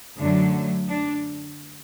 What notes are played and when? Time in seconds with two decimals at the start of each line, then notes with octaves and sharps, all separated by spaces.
0.19 F#2 D3 F#3 A3 D4
0.88 D4